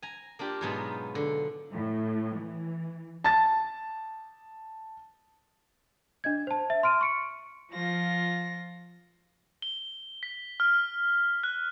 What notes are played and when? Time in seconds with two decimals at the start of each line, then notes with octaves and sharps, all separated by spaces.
0.02 G#5 A#5
0.39 A#3 D4 F4 G4
0.61 G#2 B2 F#3 B3 D#4 F4
1.15 D3
1.73 A2
2.37 E3
3.24 A5 A6
6.24 D4 D#5 G#6
6.47 C5 A5
6.70 E5
6.83 C6 F6 D7 D#7
7.01 C#6 C#7 D7
7.71 F3 F4 A#6
9.62 G7
10.23 B6
10.60 F6
11.43 F#6